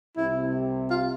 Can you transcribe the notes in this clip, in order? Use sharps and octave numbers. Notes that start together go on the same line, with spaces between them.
C2 C3 E4
F4